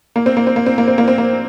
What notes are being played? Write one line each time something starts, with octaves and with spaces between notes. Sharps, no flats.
A#3
C4
A#3
C4
A#3
C4
A#3
C4
A#3
C4
A#3